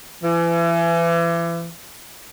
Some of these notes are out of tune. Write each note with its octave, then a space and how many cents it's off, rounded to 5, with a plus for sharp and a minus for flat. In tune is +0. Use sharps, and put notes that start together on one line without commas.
E3 +35